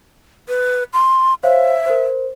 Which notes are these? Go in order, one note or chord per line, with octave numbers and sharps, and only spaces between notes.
B4
C6
C5 C#5 E5 F5
A#4 C5